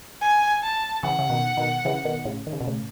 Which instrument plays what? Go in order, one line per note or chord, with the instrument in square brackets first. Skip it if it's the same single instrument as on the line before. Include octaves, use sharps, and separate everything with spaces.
[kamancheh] G#5
A5
[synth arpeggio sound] C#3 E3 [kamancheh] F#5
[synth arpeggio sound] C#3
B2 D#3
B2 D#3
C#3 E3
B2 D#3
A2 C#3
D#3
C#3
B2
A2 C#3